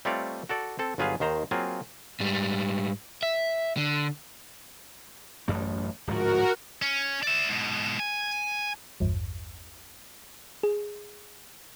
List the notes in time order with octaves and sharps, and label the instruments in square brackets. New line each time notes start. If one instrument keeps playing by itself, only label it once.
[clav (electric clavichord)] G3 A3 C4 F4 C#5 D5
F#4 A4 D5
C4 A4
G1 F#3 F4 G#4 B4 F5
D#2 D#3 C5 A#5
F#3 A#3 C4 F4 G#4
[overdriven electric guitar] G#2 G3
E5
D3
[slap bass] A1 F#2 A3
[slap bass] D1 G#2 F3 [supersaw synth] F#4 A#4
[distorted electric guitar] C#4
D5 E5
G#2 B2
G#5
[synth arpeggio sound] A1 E2 G2
G#4